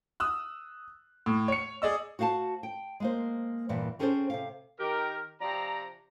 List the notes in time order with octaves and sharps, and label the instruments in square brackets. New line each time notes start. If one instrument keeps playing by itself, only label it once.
[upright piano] D#6 E6 F#6
A2
C#5 C#7
G#4 D5 D#5 E6
[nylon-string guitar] F#4 C5 F5 F#5 A5
G5
G#3 A#3 C5
E2 G2 A#2 E3
C4 C#4 G#4 A4 B4 C5
C3 F5
[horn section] D#3 G4 A#4
C3 F3 C4 D5 A#5